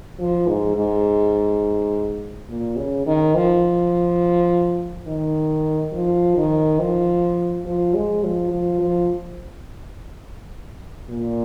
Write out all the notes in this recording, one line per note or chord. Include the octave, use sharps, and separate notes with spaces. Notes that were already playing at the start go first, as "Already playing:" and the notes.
F3
G#2
G#2
A#2
C#3
D#3
F3
D#3
F3
D#3
F3
F3
G#3
F3
F3
F3
A#2